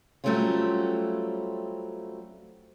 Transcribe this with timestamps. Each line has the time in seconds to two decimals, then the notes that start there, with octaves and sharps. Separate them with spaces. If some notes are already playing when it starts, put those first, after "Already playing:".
0.24 F#3 G3 A3 C4 C#4 F4